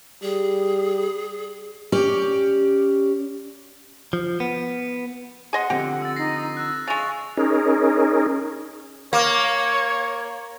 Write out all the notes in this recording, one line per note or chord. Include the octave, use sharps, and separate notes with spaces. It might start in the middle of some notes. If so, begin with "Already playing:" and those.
G3 G#4
C#4 G4 D5
F3
B3
G#4 D#5 F#5 C6
D3 F3 C4 G4
E6 A6
D#4 A#6 C7
E6 F#6
C#3 G#3 C#6 A6 F7
C#4 D#4 G#4 A#4
A#3 C#5